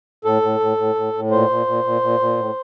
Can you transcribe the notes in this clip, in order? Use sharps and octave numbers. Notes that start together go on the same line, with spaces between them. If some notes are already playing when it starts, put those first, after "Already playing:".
A2 A4
A2
A2
A2
A2
A2
A#2 C5
A#2
A#2
A#2
A#2
A#2
A2